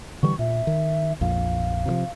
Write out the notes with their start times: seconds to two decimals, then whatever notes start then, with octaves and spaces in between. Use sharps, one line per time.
0.23 D3 E3 G3 C#6
0.39 A#2 E5
0.67 D#3
1.21 A#1 F2 F5
1.86 C3 D#3 F3